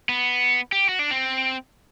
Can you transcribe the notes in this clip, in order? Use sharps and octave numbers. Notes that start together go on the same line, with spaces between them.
B3
G4
F#4
D4
C4